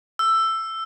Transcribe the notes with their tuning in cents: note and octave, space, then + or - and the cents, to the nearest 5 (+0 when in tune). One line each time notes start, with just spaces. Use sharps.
E6 +10